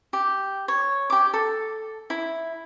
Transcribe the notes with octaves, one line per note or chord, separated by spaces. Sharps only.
G4
C#5
G4 D6
A4
E4